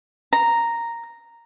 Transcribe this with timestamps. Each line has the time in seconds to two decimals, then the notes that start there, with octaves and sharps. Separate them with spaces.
0.33 A#5